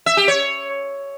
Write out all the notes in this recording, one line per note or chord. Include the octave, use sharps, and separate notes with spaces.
E5
G4
C#5